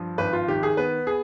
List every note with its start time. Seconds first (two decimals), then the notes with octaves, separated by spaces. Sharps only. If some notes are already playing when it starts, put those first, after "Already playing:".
Already playing: G2 F3
0.18 G#1 B4
0.33 F4
0.48 D#3 G4
0.63 G#4
0.77 B3 B4
1.07 G#4